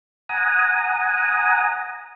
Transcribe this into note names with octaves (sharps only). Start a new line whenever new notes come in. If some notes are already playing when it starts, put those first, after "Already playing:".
F#5 G#5 A#5 D#6